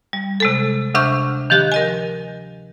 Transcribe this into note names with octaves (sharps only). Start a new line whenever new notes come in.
G3
C3 G#3 A4
D2 C3 D4 E5 C#6 G6
D#3 F3 G4 F#6
A#4 D#5 G#5